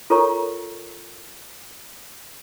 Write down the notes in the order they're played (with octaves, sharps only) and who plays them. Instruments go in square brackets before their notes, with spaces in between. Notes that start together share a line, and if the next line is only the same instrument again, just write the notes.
[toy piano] F4 A4 A#4 C#5 A#5 C#6